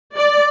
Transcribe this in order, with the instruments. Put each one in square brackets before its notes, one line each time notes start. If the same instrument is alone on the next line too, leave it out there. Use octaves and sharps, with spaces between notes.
[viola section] D5